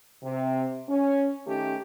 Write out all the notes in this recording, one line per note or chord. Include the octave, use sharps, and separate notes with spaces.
C3
C#4
D#3 A3 C#4 G4